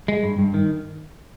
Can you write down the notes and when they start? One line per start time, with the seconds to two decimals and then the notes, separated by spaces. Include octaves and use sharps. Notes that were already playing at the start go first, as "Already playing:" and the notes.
0.08 G#3
0.23 G2
0.39 G2
0.54 D#3